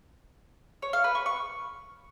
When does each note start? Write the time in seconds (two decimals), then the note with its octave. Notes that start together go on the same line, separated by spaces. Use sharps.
0.82 C#5
0.93 F5
1.04 B4
1.15 C#6
1.26 C#6